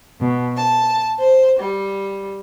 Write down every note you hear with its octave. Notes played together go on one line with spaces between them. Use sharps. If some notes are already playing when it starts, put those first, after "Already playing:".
B2
A5
C5
G3